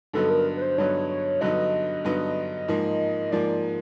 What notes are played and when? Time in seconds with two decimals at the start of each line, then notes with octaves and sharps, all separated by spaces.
0.13 G2 D3 F#3 B3 D#4 A4
0.30 A#4
0.57 B4
0.62 C5
0.78 G2 D3 F#3 B3 D#4 C#5
1.09 C#5
1.41 G2 D3 F#3 B3 D#4 D#5
2.04 G2 D3 F#3 B3 D#4 D#5
2.68 G#2 F3 A#3
3.32 G#2 F3 A#3 D5